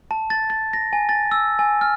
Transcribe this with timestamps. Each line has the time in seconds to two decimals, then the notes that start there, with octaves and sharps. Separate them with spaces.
0.11 A5
0.30 A6
0.50 A6
0.73 A#6
0.93 G#5
1.09 A6
1.31 E6
1.59 G#5
1.81 F6